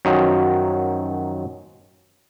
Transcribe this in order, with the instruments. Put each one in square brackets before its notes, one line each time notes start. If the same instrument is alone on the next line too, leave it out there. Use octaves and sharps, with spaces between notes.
[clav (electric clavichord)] F#2 D#3 F3 F#3